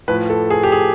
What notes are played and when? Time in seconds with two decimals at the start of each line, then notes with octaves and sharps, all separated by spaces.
0.08 A2 F3 B4
0.30 A4
0.50 G#4
0.63 G4
0.72 G#4